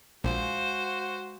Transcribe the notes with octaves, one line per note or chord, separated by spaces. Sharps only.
A#1 G#3 F#4 C5 F5